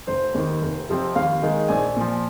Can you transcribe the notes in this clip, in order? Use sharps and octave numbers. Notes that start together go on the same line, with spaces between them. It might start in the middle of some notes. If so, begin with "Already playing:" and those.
F1 C5
D#2 D#3
F1
F2 C3 F3 C4
D#2 F5
D#3 G#3 D#4
A#1 G#5
A#2 F3